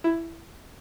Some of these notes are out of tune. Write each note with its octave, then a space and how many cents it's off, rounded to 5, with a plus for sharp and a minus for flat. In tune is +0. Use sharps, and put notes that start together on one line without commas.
E4 +10